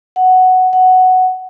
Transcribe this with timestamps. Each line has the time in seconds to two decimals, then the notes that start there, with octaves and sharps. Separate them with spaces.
0.16 F#5
0.73 F#5